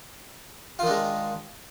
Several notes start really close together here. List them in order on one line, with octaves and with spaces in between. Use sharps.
F4 D#3 D4 G#3